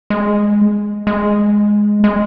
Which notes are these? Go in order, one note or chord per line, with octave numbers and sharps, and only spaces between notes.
G#3
G#3
G#3